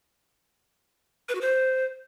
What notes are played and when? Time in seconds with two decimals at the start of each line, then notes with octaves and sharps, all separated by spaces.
1.29 B4
1.35 F#4
1.41 C5